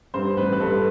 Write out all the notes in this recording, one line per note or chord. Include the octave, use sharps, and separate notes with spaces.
G2 C5
A1 B4
B4
G2 A4